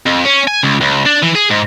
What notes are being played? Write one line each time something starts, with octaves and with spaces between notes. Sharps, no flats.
F2
C#4
G#5
C#2
C#2
D4
E3
G#4
G#2